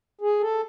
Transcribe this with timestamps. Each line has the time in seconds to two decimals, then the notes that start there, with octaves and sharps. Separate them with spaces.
0.21 G#4
0.41 A4